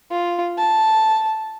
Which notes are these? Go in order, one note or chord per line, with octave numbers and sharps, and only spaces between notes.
F4
A5